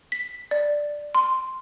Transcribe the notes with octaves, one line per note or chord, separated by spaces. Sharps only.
B6
D5
C6